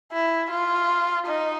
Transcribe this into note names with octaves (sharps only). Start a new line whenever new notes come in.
E4
F4
D#4